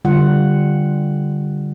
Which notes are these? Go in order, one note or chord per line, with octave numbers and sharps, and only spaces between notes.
D3 G3 F4 F#5